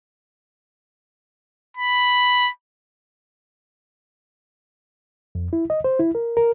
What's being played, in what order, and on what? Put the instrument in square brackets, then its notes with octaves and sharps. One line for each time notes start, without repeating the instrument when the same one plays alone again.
[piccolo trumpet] B5
[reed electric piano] F2
E4
D#5
C5
E4
A#4
A#4